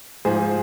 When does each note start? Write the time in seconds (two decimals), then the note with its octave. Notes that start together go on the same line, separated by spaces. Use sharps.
0.25 G#2 F3 G#4 C5